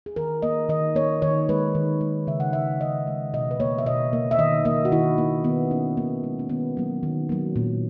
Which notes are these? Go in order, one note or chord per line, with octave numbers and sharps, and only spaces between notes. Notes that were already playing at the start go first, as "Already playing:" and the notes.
G#4
D#3 A#4
A#3 D#5
D#3 D#5
A#3 C#5
D#3 C#5
G#3 B4
D#3
G#3
C#3 E5
F#5
G#3 E5
C#3 D#5
G#3
B2 D#5
B4
A#3 C#5
E5
B2 D#5
A#3
E5
D#3 D#5
A#3 D#5
F#4
D#3 E4
A#3
D#3 B3
G#3 C#4
D#3 A#3
G#3
C#4
D#3 B3
F#3 A#3
D#3
F#3 A#3
A#2